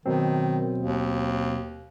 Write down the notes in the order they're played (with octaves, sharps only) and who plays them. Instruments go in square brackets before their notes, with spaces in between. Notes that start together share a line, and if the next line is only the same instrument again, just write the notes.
[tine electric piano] B2 F#3 C4 [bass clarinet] D#3
[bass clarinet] D#2